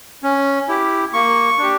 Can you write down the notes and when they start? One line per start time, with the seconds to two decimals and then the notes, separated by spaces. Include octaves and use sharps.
0.23 C#4
0.68 E4 G4
1.13 A#3 C#6
1.58 D4 G4